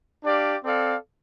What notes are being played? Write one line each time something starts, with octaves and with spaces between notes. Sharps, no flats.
D4 G4 D5 F5
C4 A4 D5 F5